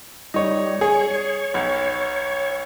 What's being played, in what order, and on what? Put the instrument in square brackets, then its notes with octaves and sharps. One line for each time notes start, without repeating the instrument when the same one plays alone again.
[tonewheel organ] G3 [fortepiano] D#4 C#5
[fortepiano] G#4 [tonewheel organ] C#5
[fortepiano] B1